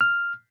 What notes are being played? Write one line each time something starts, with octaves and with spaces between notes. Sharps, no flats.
F6